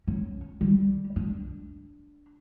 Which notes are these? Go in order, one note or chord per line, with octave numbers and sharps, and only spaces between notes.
C#4
G3
D4